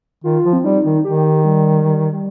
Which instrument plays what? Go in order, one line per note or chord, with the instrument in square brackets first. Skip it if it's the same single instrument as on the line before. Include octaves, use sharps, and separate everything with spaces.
[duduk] D#3 [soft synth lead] F4
[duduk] F3
[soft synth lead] C4
[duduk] G3 [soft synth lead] D#4
[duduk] D#3
[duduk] D#3 [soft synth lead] G4
[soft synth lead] G3
G3
G3